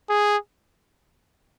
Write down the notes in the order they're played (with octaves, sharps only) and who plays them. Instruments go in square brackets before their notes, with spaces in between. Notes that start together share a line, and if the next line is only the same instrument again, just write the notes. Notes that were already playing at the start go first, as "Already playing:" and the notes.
[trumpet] G#4